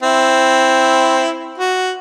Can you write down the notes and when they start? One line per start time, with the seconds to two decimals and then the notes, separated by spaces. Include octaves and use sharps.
0.03 C4 E4
1.58 F#4